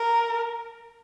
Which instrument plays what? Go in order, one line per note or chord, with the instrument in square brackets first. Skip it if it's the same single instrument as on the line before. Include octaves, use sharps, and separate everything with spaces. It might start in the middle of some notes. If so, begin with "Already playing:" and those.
Already playing: [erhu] A#4